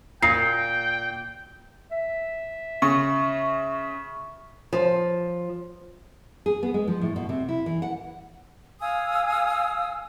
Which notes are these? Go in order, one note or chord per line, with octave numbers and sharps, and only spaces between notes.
A#2 G5 C7
E5
C#3 C#6
F3
G#4
B3
G#3
F3
A2
B2
C3
E4
E3
F#5
F5 G#5 D#6 E6